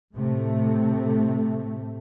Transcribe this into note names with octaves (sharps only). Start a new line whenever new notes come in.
A2 C3 A3